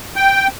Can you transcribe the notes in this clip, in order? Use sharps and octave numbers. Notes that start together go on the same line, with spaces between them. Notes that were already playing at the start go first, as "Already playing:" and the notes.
G5